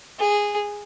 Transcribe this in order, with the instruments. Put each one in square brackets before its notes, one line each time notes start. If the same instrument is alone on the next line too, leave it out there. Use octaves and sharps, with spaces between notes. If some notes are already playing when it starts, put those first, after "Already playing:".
[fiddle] G#4